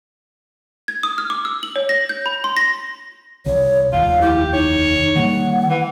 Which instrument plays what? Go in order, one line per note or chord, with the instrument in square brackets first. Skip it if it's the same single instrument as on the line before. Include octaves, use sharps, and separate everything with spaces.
[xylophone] G#6
D#6
F6
D6
E6
F#7
C#5
A#6
G6
B5
C6
A#6
[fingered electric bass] C2 [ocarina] C#5
[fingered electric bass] F1 D#2 [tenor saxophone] F4 [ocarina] F5
[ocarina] E4 [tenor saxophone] G4
[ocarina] D#4 [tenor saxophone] C#5
[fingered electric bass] D#3 G3 A#3 [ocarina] F#5
[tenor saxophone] E3